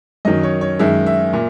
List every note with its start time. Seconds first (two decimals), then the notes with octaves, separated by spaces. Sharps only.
0.25 F#2 D#3 F#3 D#5
0.43 C#5
0.61 C#5
0.79 F#2 D#3 G#3 E5
1.06 E5
1.33 A#2